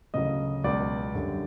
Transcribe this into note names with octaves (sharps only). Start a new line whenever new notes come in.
D2 C#3 F#3 D#5
C#2 B2 F#3 D5
F#2 D3 G3